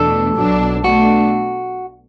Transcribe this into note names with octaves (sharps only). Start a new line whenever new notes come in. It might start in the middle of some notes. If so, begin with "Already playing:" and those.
Already playing: E2 B2 A3 D4 A4
B1 B2 F#3 D4
B2 A3 D4 F#4